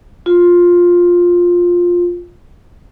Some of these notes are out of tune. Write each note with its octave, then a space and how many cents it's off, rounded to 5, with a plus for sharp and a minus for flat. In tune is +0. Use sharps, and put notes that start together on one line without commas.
F4 +10